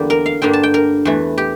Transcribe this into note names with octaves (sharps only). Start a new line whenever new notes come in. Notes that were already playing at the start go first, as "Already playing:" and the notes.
Already playing: E2 D3 G3 A#3 G4
A#4
F5
G2 D3 G3 A#3 D4 G5
A5
G5
A#4
E2 E3 A3
G4